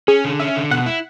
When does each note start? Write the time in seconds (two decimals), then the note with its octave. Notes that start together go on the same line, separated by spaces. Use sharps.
0.08 C#4 G#4
0.25 D3
0.40 C#4 E5
0.56 D3
0.71 B2 F#5
0.86 E4